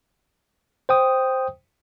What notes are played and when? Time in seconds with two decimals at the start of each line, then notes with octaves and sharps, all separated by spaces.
0.89 C5 G5 D#6